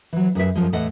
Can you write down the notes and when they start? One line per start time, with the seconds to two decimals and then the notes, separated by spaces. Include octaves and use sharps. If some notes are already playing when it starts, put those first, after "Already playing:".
0.13 E3 F#3
0.35 F#2 G#4 B4 E5
0.55 F#2 F3 G#3
0.73 E2 A2 E3 A4 D#5 F#5